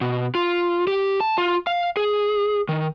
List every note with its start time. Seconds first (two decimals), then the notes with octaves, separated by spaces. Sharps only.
0.01 B2
0.35 F4
0.87 G4
1.20 A5
1.38 F4
1.67 F5
1.97 G#4
2.69 D#3